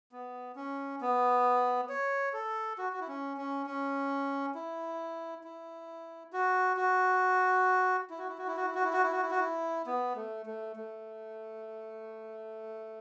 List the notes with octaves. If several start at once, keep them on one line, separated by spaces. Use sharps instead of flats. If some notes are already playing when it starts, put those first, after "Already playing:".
B3
C#4
B3
C#5
A4
F#4
F#4
E4
C#4
C#4
C#4
E4
E4
F#4
F#4
E4
F#4
E4
F#4
E4
F#4
E4
F#4
E4
F#4
E4
F#4
E4
F#4
E4
B3
A3
A3
A3